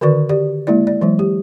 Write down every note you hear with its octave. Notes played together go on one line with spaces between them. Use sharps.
D3 D#3 F#4 B4 D5 C#6
G4 D5
G#3 A#3 E4 D5
D5
E3 F#3 G#3
G4